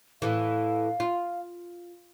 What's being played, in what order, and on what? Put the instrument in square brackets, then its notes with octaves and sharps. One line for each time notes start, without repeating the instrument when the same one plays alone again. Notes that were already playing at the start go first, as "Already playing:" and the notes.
[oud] A2 E3 [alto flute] F5
[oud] F4